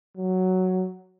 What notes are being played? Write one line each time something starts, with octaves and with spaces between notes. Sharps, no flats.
F#3